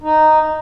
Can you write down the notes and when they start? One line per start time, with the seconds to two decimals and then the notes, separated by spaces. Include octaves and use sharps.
0.01 D#4